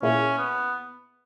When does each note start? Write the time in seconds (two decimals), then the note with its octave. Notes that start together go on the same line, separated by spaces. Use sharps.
0.02 A#2 A#3 C#4 E4 G#4
0.38 B3